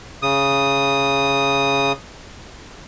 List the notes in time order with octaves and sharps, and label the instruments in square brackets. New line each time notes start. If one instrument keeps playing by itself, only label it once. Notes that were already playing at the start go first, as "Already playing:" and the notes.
[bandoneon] C#3 D#6